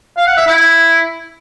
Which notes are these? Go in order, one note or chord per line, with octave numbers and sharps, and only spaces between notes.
F5
F#5
E5
E4